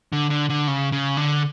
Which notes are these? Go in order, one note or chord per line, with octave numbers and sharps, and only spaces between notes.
D3
D3
D3
C#3
C#3
D3